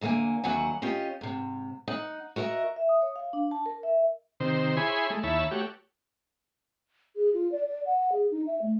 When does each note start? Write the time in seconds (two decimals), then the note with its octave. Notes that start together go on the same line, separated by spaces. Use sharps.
0.01 E2 D3 A#3 A4 G#5
0.44 D#2 D3 F#3 E4 F#5 G#5
0.82 C#4 F4 G4 D#5
1.21 G#2 C3
1.88 D#4 F#5
2.36 F#4 A#4 D#5 E5
2.76 E5
2.89 D#6
3.02 C#5
3.16 F5
3.33 D4
3.51 A5
3.66 A#4
3.83 E5
4.40 C3 D#3 C5
4.77 E4 G#4 C#5 G#5 B5 C6
5.10 G#3 A3
5.23 D#2 E4 C#5 E5 A5 B5
5.51 A3 F#4 G4 C#5
7.16 G#4
7.34 F4
7.52 D5
7.66 D5
7.86 F#5
8.12 G#4
8.31 D#4
8.47 E5
8.62 A3